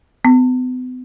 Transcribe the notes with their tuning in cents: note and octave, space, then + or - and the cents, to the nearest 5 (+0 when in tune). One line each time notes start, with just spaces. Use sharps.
B3 +40